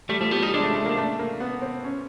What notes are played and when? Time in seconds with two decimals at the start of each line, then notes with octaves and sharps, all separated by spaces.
0.09 G3 A3
0.20 F3 A3
0.31 G3 B3
0.42 G3 D#4
0.54 G#3 D4
0.64 A3
0.75 A3
0.86 A#3
0.97 A3
1.19 A#3
1.40 B3
1.62 C4
1.84 C#4